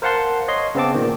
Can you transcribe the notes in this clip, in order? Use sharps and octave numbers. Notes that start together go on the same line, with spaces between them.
A#4 C5 F5 F#5 A5 C6
C#5 D#5 C6
C#3 B3 C4 A5 D6
A#2 D#3